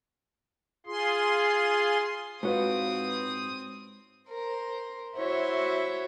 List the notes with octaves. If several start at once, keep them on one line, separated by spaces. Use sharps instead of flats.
F4 G#4 C6
G#2 C4 F4 F#4 B4 C#5 D#6
A#4 C5
E4 F#4 C5 C#5 E5